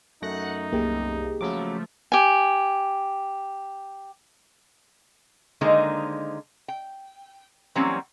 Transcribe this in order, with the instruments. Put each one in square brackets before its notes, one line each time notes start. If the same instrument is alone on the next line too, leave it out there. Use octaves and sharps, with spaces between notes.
[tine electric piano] F#2 A3 A#6 [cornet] D#4 [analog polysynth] F#5
[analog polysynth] C2 [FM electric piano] A#3 G4 G#4
[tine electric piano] C#3 F#3 D6 [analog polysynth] F3 A3
[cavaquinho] G4 G#5
[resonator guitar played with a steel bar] D3 D#3 G#3 A#3 D#4 C5
G5
E3 F#3 G3 A#3 C4 C#4